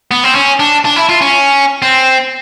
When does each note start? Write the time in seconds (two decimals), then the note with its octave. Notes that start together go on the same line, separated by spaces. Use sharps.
0.11 B3
0.24 C4
0.35 C#4
0.60 D4
0.85 D4
0.96 E4
1.09 F4
1.21 C#4
1.82 C4